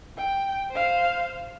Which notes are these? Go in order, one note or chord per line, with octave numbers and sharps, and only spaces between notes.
G5
C5 F5